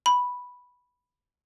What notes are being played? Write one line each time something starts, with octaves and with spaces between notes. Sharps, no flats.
B5